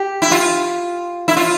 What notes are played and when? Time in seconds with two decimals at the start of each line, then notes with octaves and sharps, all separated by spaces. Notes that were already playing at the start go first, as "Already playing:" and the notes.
Already playing: G4
0.22 E4
0.31 F4
1.28 E4
1.37 F4